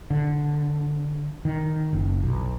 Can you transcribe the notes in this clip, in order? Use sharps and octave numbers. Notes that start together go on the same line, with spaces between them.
D3
D#3
F#1
B1